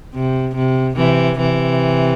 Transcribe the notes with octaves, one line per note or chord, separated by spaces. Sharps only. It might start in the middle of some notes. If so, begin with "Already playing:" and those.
C3
C3
C3 E3
C3 E3